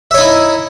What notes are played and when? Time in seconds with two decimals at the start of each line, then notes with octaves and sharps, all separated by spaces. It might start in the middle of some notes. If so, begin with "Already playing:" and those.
0.11 E5
0.14 C#5
0.17 D#4
0.21 E4